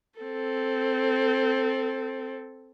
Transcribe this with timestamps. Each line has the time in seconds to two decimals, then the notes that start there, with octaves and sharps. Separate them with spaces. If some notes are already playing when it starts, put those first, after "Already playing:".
0.19 C4 A4